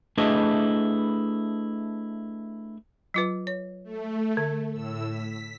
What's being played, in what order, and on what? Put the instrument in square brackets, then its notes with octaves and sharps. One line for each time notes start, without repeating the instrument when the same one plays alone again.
[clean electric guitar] A3 D4 E4 G#4 B4 D#5
[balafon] F#3 F4 B4
C#5
[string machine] A3
[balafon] D3
[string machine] A2 E6
B6